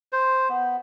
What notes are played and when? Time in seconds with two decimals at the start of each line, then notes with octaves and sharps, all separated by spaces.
0.13 C5
0.50 B3